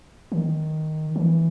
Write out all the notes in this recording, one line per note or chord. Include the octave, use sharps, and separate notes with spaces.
D#3
E3